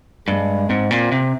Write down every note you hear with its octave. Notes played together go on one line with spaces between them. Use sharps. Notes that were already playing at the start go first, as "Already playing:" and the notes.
G2 G#3
G#2 C4
A#2
C3